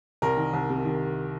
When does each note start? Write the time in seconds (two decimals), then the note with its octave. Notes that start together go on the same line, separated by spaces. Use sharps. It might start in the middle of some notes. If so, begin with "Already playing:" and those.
0.22 C2 A#4
0.37 D#3
0.53 C2
0.69 C3
0.84 D#3